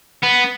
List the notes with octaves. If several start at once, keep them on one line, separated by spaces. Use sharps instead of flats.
B3